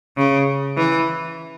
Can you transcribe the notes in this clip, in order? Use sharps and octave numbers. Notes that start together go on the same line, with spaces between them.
C#3
E3